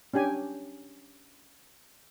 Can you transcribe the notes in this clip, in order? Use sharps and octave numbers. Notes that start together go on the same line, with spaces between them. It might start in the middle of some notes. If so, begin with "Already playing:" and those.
C#4 D4 G4 G#5